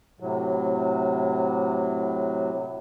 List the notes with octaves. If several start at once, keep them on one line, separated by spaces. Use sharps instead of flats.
A2 C3 F#3